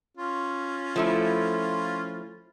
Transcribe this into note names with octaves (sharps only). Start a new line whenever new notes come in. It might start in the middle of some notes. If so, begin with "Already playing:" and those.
C#4 F4
F3 A3 E4